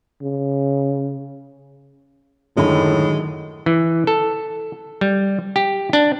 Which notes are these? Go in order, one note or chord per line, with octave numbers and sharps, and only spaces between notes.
C#3
F#2 A2 D3 D#3 G#3 B5
E3
A4
G3
G4
D4